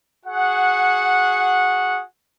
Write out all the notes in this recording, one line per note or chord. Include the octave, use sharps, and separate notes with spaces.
F#4 G#4 F#5